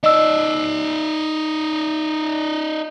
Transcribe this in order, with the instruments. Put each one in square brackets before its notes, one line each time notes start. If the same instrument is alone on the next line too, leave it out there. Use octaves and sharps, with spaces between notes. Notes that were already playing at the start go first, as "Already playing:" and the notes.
[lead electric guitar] D#4 D5 [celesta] D#5 E6